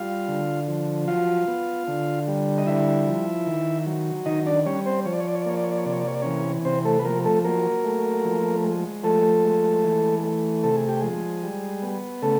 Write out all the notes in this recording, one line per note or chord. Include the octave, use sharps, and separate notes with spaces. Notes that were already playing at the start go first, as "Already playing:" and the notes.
Already playing: G3 F4 F5
D3
F3
F#3 F4 F5
B3
D3
G3
D#5
D3 E4 E5
F3
D#3
F#3
D#3 D#4 D#5
D4 D5
G3 C#4 C#5
C4 C5
F3 C#5
D5
C#5
D5
C#5
D5
A#3 C#5
D5
C#5
D5
C#5
C3 D5
C#5
D5
C#5
D5
E3 C#4 C#5
C3 C4 C5
A3 A4
B4
F3 A#3 A#4
A3 A4
F#3 A#3 A#4
A3
F3
G#3
F3 A3 A4
G#3
E3
A3
C3 A4
G#4
G4
F3 G#3 G#4
G3
B3
C#3 A3 A4